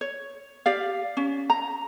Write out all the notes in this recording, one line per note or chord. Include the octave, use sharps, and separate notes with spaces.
C#5
G4 D5 F5
C#4
A#5